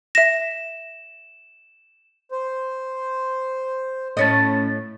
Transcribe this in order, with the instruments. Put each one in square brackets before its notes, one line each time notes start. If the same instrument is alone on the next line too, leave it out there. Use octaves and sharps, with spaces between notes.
[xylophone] E5 A#6 [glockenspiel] E7
[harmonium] C5
[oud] A2 C#5 D#5 [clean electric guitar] A3 C#4 A5